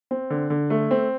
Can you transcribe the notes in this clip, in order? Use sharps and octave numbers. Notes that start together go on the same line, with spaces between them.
C4
D3
D3
A3
C4